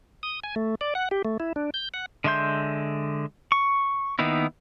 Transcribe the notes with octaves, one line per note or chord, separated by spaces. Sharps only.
D#6
G#5
A3
D5
F#5
G4
A3
E4
D4
G6
F#5
D3 G#3 E5 C6 G6
C#6
D#3 A#3 B3 D#4 E4